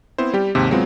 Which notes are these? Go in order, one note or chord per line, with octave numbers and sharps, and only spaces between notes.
B3 C4 E4 C5
G3 G4
D#2 G#2 C3
F#3 G#3 B3 C4 F4